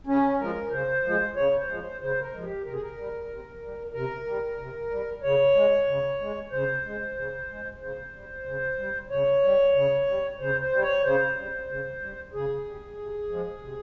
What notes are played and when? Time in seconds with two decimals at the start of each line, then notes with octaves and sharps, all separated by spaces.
0.07 C#3 C#4
0.39 F3 G#3 A#4
0.71 C#3 C5
1.04 F3 G#3
1.36 C#3 C#5
1.58 C5
1.68 F3 G#3
1.80 C5
2.01 C#3 C5
2.21 A#4
2.33 F3 G#3
2.43 G4
2.65 C3 A#4
2.73 G#4
2.81 A#4
2.97 G3
3.29 C3
3.63 G3
3.94 C3 A#4
4.27 G3
4.58 C3
4.90 G3
5.23 C#3 C#5
5.55 G#3
5.87 C#3
6.21 G#3
6.52 C#3 C5
6.85 G#3
7.17 C#3
7.49 G#3
7.81 C#3 C5
8.14 G3
8.45 C#3
8.78 G3
9.10 C#3 C#5
9.43 G3
9.75 C#3
10.07 G3
10.39 C#3 C5
10.61 C5
10.72 G3
10.83 C#5
11.04 C#3 C5
11.36 G3
11.69 C#3
12.01 G3
12.34 C#3 G#4
12.65 G3
12.98 C3
13.30 F3 G#3
13.63 C3